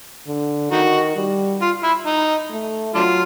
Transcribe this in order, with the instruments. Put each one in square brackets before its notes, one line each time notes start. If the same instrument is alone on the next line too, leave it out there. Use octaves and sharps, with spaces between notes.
[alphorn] D3
[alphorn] D#3 [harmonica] D#4 F#4
[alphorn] G3
[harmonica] F4
E4
D#4
[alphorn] A3
[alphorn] F#3 [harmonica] D4 F4